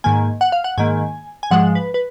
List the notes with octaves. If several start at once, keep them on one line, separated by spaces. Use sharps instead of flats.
G#2 D#3 A#3 G#5
F#5
F5
F#5
G#2 D#3 A#3 G#5
G#5
G#2 F3 G#3 F#5
B4
B4